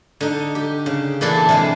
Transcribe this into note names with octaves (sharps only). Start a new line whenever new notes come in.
D3 D#4
G4
C#3
A#2 D3 E3 D4 E4 A4
C3 E3 G#3